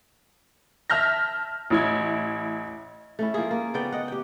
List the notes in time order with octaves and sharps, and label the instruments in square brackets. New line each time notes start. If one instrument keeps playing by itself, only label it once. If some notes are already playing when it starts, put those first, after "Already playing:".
[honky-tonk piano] E5 A5 F6 G6 A#6
A1 E4 G#6
[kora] A3 C#4 E4
F3 A#3 G#4
A#3
C#3 B3 D5 G5
D#5 F#5
G4 G5